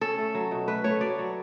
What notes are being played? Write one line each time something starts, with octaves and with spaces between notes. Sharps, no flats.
C#4 A4
A3
F#3
B2
A3 B4
A3 C#5
F#3 D5
F#3